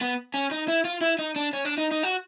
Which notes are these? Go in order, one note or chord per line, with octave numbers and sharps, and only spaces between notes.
B3
C#4
D#4
E4
F4
E4
D#4
D4
C#4
D4
D#4
D#4
F#4